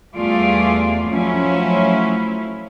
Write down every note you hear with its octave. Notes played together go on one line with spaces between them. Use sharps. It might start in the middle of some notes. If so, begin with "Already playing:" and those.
E2 G3 A3 F4 G#4 D5
F3 F#3 A3 C#4 E4